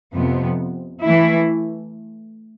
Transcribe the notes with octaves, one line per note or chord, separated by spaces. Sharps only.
F2 C3 F3 B3
E3 A3 E4